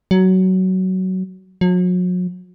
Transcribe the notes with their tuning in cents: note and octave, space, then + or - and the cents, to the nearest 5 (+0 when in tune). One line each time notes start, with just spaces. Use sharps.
F#3 +15
F#3 -40